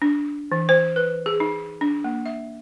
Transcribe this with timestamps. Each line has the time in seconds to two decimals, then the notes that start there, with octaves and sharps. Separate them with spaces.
0.02 D4
0.52 E3
0.69 C5
0.96 B4
1.26 G#4
1.40 D#4
1.81 D4
2.04 A#3
2.26 E5